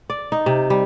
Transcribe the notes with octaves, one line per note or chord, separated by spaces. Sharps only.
D5
D#4
C3
G3